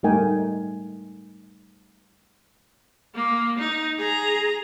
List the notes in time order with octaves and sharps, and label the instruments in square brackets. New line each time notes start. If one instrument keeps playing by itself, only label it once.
[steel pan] G3 A3 D#4 A#4 G5 G#5
[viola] A#3
D#4
G#4 A#5